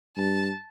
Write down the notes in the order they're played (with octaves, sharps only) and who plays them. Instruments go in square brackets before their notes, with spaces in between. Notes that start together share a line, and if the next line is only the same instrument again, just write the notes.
[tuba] G2 [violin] A5